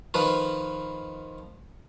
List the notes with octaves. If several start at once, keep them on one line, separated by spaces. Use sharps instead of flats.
D#3 F3 B4